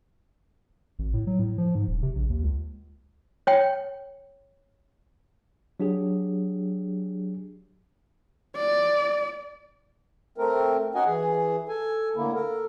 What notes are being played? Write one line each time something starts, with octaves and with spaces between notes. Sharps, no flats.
G#1
A2
F#3
A2
F3
G#2
D#1
C3
A#1
D#2
C#2
C#5 G5
F#3 D4 G4 G#4
D5
A3 C4 A#4
C#4 D#4 F#4 D#5 F#5 G#5
E3 G#4
A4 G#5
A2 D3 A#3 E4
A4 A#4